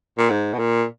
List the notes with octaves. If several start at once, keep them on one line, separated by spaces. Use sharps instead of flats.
A#2
G#2
B2
A#2